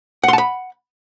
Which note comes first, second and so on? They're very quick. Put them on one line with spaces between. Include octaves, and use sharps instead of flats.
F#5 C6 A5 B5